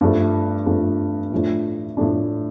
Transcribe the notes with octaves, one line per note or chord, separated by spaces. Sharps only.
G2 F3 A3
G2 F3 A3
A2 F3 A3 D4
A2 F3 A3 D4